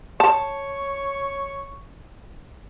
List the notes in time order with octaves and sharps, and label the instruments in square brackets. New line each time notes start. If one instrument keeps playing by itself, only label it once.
[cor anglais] C#5 [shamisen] A5